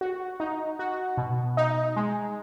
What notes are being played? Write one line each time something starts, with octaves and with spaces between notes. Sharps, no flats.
F#4
D#4
F#4
B2
D#4
G#3